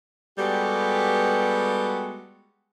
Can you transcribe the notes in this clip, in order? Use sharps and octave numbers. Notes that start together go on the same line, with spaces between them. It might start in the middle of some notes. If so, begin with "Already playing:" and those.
G3 G#3 B3 F#4 G4 A4